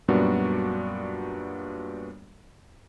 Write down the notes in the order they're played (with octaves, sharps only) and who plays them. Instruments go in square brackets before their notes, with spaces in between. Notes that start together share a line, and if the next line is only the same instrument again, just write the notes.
[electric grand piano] F#2 A#2 G3 B3 D4 F#4